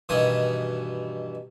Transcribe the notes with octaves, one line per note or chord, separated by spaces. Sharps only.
G2 B2 D#3 E3 G#5 D#6